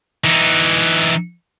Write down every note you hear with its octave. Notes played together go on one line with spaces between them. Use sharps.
E3 D#4